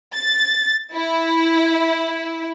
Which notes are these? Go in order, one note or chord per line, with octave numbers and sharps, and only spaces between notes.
A6
E4